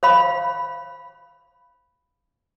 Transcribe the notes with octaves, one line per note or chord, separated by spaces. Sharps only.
C5 F5 B5